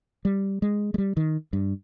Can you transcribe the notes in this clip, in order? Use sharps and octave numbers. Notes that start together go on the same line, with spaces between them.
G3
G#3
G#3
G3
D#3
G2